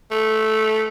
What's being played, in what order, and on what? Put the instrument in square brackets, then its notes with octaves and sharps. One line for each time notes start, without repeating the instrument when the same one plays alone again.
[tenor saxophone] A3